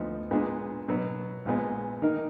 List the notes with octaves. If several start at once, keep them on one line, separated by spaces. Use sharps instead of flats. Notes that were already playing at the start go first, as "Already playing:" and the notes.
Already playing: D2 D3 F3 B3 D#4
A#2 G#3 B3 D4 G#4
B2 F#3 B3
A#1 A#2 G#3 B3
D#3 A#3 D#4 A#4